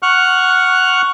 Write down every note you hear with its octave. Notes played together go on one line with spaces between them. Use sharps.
F#5 C#6 F6 F#6